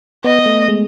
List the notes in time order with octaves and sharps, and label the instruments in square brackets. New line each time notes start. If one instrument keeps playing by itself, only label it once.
[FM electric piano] B3 [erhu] D#5
[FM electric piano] B3
A3
G#3